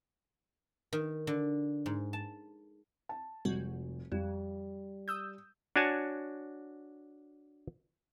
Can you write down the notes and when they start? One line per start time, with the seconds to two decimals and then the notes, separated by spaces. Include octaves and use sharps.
0.93 D#3
1.27 D3
1.86 G#2
2.13 A5
3.09 A5
3.45 F1 G3 G#3 F#4
4.12 F2 G3
5.08 D#6 E6 G6
5.76 D4 F#4 C#5 G#5 A5